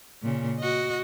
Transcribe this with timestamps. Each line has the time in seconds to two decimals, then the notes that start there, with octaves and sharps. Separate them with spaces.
0.22 A#2 C#3
0.59 F#4 D#5